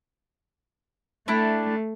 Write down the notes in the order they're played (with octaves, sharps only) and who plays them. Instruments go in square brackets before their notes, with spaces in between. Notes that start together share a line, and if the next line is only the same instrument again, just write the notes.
[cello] A3 [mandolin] D4 E4 G5